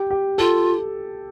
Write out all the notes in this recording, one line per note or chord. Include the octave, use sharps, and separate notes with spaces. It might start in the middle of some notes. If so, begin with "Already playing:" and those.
Already playing: G4
G4
F4 A4